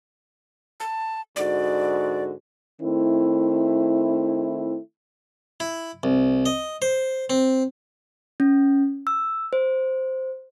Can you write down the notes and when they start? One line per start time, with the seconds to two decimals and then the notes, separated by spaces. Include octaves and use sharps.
0.80 A5
1.36 G#2 D3 F#4 D5
2.82 D#3 A3 C4 E4
5.60 E4
6.03 C2
6.46 D#5
6.82 C5
7.30 C4
8.40 C#4
9.07 E6
9.53 C5